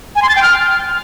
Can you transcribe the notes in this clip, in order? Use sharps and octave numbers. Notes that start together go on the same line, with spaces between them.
G#5
C6
A6
G5
F6